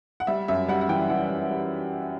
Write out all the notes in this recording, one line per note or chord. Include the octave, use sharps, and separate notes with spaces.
F#5
G3 E5
F#2 E5
G3 F#5
F#5
E3 G5
E3 F#5
G3
G3